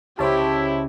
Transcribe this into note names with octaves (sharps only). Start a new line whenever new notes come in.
C#2 E4 G4 C5 C#5 A5